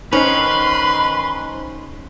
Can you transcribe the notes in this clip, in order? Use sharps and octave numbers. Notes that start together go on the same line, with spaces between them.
D#3 C#4 D#4 B4 C5 D#5 B5 C6